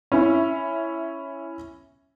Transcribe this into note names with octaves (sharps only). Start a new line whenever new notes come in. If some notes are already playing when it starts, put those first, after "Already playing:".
C#4 E4 E5